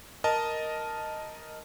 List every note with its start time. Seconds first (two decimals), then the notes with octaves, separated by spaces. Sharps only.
0.24 A#4 D#5 A5